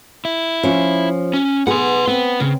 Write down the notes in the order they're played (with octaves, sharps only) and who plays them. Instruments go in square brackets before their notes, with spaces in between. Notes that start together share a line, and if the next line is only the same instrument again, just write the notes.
[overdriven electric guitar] E4
[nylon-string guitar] F3 C#4
[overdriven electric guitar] C#4
[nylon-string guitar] B3 G#4 [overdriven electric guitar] F#5 C6
[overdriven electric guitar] B3 [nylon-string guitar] C4
[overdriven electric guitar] C#3 [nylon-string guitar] C4